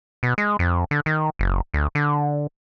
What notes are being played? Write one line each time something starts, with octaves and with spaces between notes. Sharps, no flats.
B2
G#3
F2
D3
D#3
F#1
D2
D3